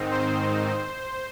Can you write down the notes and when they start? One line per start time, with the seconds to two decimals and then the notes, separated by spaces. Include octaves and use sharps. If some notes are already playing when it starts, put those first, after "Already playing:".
Already playing: G#2 D#3 C4 D#4
0.11 C5